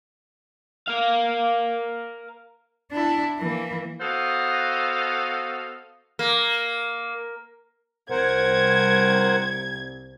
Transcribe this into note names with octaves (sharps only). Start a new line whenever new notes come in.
A#4 F5
D4 E4
E3 A#3
B3 F#4 A4 C5 D#5 F5
A#3
C2 A#4 C5 F#5 G#6